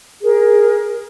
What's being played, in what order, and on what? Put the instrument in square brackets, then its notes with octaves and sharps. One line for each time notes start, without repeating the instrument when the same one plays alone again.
[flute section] G#4 A#4